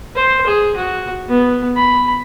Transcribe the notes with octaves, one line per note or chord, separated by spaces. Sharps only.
C5
G#4
F#4
B3
B5